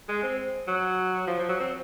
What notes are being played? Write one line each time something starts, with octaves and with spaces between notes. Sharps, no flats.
G#3
C4
F#3
F3
F3
F#3
C4